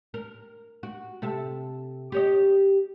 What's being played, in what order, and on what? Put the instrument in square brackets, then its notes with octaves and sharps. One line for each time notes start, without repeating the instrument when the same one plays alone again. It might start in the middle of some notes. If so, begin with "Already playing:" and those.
[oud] A#4
F#4
C3 A4 E5
G4 C#5 D#5